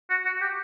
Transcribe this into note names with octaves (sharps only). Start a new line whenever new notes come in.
F#4
F#4
G4